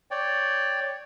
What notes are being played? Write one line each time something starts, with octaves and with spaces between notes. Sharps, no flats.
C#5 D5 G5